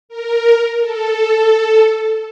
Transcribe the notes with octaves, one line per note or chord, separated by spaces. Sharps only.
A#4
A4